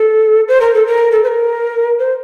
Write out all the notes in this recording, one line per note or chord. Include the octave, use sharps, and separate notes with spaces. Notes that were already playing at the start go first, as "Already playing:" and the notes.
Already playing: A4
C5
A#4
A4
A#4
A4
C5
A#4
C5